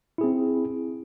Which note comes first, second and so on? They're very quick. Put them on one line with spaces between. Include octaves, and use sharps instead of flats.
E4 G#4 C4